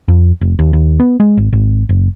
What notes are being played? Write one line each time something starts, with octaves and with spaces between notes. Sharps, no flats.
F2
F1
D#2
D#2
B3
G#3
G#1
G#1
F#1